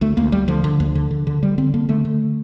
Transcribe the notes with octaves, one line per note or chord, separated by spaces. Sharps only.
D2 A3
D2 A#3
D2 G3
D3 F3
D3
D2
D3
D3
D3
D3 G3
D3 C4
D3 A#3
D3 A3
D3